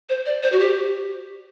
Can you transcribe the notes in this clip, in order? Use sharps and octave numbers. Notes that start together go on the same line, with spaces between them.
C5
D5
C5
F#4
G4